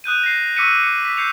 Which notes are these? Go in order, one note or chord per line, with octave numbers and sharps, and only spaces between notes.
D#6 F#6 G6 D#7
A#6 C7
C#6 D6 E6 B6 C#7 D#7
D6 C#7
B6
G6 C7 C#7 D#7 F7